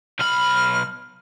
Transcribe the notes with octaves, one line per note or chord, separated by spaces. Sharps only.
B1 B5 F6